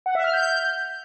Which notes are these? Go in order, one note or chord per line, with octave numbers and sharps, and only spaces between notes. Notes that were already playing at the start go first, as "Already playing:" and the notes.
F#5
E5
F6
G6